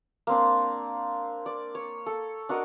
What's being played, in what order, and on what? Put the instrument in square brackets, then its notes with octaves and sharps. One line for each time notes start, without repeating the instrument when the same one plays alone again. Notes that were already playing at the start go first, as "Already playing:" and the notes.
[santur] A#3 C4 D4
D5
C#5
A4
D4 F#4 A#4 D#5